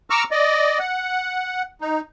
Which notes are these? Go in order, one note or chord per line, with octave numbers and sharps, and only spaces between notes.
A#5 C#6 D6 E6 F6
D5 D#5
F#5
D#4